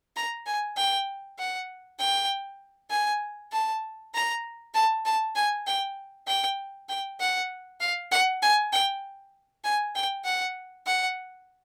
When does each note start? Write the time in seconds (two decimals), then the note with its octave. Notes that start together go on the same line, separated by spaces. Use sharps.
0.16 A#5
0.46 G#5
0.77 G5
1.39 F#5
1.99 G5
2.91 G#5
3.52 A5
4.14 A#5
4.74 A5
5.05 A5
5.36 G#5
5.67 G5
6.27 G5
6.89 G5
7.20 F#5
7.80 F5
8.11 F#5
8.42 G#5
8.73 G5
9.64 G#5
9.95 G5
10.25 F#5
10.87 F#5